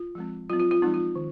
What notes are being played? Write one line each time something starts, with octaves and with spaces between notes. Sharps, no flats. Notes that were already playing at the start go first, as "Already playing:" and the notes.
Already playing: F4
F3 G#3 C4
F#3 C4 F4
F4
F4
F3 G#3 C4 D#4
F4
D#3